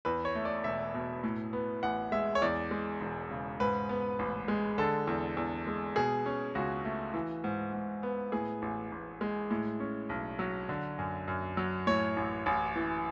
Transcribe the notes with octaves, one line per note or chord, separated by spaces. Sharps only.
E2 B4
C#5
A3
D5
E1 E5
B2
A2
B3
A1 F#5
G#3 E5
C#5
E2 D5
G#3
E1
C#3
G#2 B4
B3
A1
G#3
D3 A4
E2
E2
G#3
B2 G#4
C#4
C#2 F#4
A3
E3
G#2
G#2
B3
A2 G#4
A1
A1
G#3
A2
C#4
B1
F#3
D3
F#2
F#2
F#3
A2 C#5
A1
A1
E3